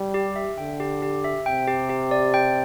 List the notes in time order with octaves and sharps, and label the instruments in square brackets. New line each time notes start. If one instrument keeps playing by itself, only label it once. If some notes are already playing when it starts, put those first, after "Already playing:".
Already playing: [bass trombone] G3
[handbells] G4
E5
[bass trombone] D3 [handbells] G5
[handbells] G4
G4
E5
[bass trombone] C3 [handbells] G5
[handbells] G4
G4
D5
G5